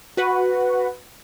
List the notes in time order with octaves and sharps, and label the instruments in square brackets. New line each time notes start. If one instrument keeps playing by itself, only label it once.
[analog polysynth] F#4 B4 F#5